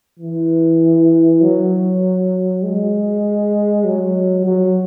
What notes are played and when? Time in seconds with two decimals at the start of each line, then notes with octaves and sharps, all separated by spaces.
0.20 E3
1.41 F#3
2.63 G#3
3.85 F#3
4.45 F#3